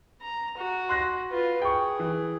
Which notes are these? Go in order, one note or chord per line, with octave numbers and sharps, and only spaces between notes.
A#5
F#4
C6 F#6 A#6
F4 B4
G#4 G5 C#6
E3